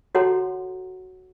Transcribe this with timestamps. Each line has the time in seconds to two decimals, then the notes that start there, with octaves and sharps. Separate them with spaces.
0.15 F#4 A4 C#5 F#5 A#5 C6